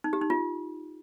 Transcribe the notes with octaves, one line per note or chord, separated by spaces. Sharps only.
D#4
G4
D#4
F4